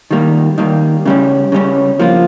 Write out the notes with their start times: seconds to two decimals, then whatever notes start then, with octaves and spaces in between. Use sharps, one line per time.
0.11 D#3 G3 A#3
0.58 D#3 G3 A#3
1.05 C#3 G3 C#4
1.52 C#3 G3 C#4
1.99 F3 A#3 F4